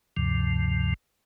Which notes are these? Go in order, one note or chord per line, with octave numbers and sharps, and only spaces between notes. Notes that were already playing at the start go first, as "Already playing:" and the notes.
D2 G2 C3 F3